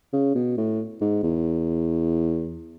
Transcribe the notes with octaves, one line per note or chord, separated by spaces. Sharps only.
C#3
B2
A2
G#2
E2